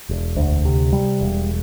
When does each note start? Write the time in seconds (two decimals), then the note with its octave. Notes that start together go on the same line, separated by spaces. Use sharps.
0.09 E1
0.36 D2
0.65 C3
0.93 G3
1.21 E1